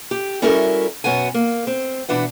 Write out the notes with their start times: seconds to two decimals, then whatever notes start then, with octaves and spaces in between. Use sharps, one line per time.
0.11 G4
0.42 G3 C#4 E4 F#4 A4 A#4
1.04 F#2 B2 F#3 B3 F#5 G#5
1.34 A#3
1.67 C4
2.09 B2 E3 D4 B4 F#5